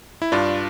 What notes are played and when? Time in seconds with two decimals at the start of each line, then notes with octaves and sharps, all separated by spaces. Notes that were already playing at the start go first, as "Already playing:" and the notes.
0.22 E4
0.32 G2 D4 F4